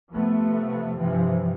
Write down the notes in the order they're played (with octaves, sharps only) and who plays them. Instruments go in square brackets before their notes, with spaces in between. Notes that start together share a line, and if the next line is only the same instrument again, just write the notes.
[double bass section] C3 F3 A3 B3
G2 C3 E3 F3